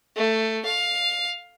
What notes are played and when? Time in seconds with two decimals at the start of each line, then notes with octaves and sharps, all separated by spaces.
0.16 A3
0.65 F5